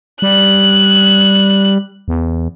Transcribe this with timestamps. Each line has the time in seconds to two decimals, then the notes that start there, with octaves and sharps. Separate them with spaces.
0.22 G3 F#6
2.08 E2